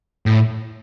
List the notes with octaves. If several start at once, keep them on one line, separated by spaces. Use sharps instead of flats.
A2